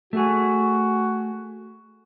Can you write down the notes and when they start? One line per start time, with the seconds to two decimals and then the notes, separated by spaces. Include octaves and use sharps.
0.13 A3 F#4 G#4